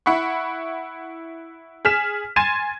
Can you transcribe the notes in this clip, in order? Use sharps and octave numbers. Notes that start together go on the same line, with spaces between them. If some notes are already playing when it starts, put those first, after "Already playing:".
E4 F#5 B5 C#6
G#4 F6 B6 E7
G#5 C6 G#6 A6 D#7 E7